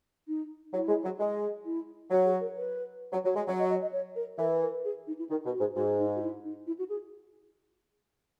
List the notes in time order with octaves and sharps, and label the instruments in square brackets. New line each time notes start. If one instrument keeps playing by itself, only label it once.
[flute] D#4
[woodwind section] F#3 [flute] E4
[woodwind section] G#3
F#3
G#3
[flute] E4
[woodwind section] F#3
[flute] G#4
A#4
B4
[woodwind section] F#3
F#3
G#3
[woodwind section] F#3 [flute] C#5
[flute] D#5
D#5
D#5
C#5
A#4
[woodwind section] E3 [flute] A#4
[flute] A#4
G#4
D#4
E4
[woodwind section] D#3 [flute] D#4
[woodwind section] B2
[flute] F#4
[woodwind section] G#2
[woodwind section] G#2 [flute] F#4
[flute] D#4
F#4
E4
D#4
E4
F#4
G#4